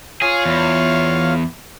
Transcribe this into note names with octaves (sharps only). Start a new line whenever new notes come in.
F4 G#4 C#5 F5
E2